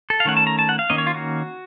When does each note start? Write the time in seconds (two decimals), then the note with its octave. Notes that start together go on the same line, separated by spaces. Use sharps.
0.10 A4
0.20 F5
0.25 D#3 A3 C#4 F#5
0.37 A5
0.47 A#5
0.59 A5
0.69 F#5
0.79 F5
0.90 D#3 A#3 C#4 D#5
0.98 C#5
1.07 F4
1.14 F#4